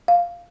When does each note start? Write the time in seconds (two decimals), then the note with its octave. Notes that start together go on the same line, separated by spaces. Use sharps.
0.08 F5